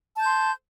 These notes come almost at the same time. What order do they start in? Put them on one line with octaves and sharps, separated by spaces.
A5 G6 C6